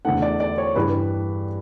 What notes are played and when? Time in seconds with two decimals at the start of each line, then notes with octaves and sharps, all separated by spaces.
0.05 E2 D3 A3 F#5
0.22 D5
0.40 D5
0.58 C#5
0.75 G2 E3 G3 B4